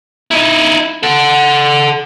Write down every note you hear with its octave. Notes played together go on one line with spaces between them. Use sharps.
D#4 E4
A4 F#5